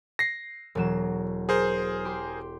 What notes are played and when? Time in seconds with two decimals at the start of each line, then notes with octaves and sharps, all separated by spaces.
0.19 A#6 C7
0.75 E1 F#3 E7
1.49 G#4 A#4 C5
2.05 G4 C6